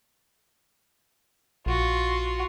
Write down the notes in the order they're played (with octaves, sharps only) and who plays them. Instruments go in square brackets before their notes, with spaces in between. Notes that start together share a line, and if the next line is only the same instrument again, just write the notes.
[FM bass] A#1 [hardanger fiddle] F4 F#4